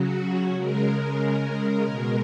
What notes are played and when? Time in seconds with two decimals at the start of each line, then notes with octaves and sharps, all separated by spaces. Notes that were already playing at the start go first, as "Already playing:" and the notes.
Already playing: C#3 F#3 F#4
0.57 C#3 G#3 A#4
1.85 B2 G#3